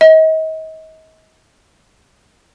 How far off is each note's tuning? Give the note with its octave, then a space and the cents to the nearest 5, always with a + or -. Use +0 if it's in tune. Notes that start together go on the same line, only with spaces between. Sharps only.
D#5 +35